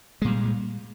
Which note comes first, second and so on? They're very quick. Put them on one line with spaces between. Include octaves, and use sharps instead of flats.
G#3 A#2 G3